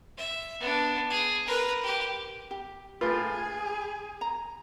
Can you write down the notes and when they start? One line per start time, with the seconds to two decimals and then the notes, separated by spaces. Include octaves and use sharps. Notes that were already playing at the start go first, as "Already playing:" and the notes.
0.17 E5
0.61 B3 D4
1.10 G#4
1.47 A#4 B4
1.83 G4
2.51 G4
3.01 A2 F4 G#4 B4
3.36 G#5
4.21 A#5